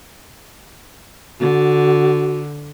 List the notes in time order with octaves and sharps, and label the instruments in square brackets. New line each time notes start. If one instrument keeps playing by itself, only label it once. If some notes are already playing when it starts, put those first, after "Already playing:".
[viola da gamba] D3 [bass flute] F#4